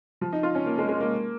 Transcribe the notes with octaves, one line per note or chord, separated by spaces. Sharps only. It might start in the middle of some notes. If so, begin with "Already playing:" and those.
F3
D#4
F4
C#4
A#3
G#3
G#3
A#3